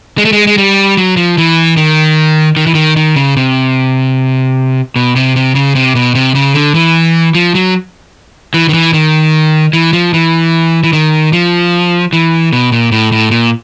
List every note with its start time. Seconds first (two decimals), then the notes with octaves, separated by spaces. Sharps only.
0.18 G#3
0.25 A3
0.33 G#3
0.47 G#3
0.58 G3
0.97 F#3
1.17 F3
1.38 E3
1.77 D#3
2.57 D#3
2.67 E3
2.75 D#3
2.97 D#3
3.16 C#3
3.37 C3
4.96 B2
5.16 C3
5.36 C3
5.55 C#3
5.75 C3
5.95 B2
6.15 C3
6.35 C#3
6.54 D3
6.75 E3
7.35 F3
7.55 F#3
8.54 E3
8.69 D#3
8.74 E3
8.93 D#3
9.73 E3
9.93 F3
10.14 E3
10.83 E3
10.93 D#3
11.33 F3
12.13 E3
12.53 B2
12.72 A#2
12.92 A2
13.12 A2
13.31 A#2